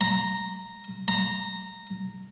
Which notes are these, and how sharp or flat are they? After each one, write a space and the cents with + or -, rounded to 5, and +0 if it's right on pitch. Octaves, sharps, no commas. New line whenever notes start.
A#5 -5
A#5 -10